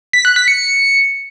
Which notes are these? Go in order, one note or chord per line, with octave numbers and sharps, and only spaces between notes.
B6
F#6
B6
C#7